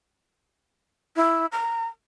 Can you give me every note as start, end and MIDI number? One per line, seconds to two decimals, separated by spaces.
1.16 1.46 64
1.52 1.85 82